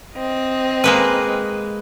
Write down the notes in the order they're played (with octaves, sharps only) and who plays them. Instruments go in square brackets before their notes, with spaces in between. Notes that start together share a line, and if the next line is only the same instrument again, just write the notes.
[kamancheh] C4 D#5
[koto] G#3 A#3 B4